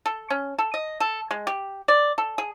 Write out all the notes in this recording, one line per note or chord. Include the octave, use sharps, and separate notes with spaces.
A4
C#4
A4
D#5
A4
G#3
G4
D5
A4
G#4